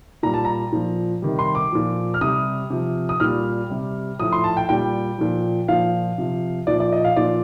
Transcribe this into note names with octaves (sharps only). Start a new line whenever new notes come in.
A#2 G3 A#5
A5
A#5
A#2 F3
C3 D#3 G3
C6
D6
A#2 F3
F6
C3 G3 D#6
C3 F3
D#6
A#2 G3 F6
C3 G3
A2 F3 D#6
C6
A5
G5
A#2 G3 G5
A#2 F3
A#2 F3 F5
C3 F3
A#2 F3 D5
D5
D#5
F5
A#2 F3 D5